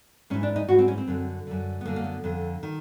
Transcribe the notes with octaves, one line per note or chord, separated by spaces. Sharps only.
G#2 E3 C#4
D4
D#4
G#2 E3 F#4
C4
C#4
C4
F#2 D3
F#2 D3
B3
F#2 D3 A#3
A#3
B3
F2 D3
D#3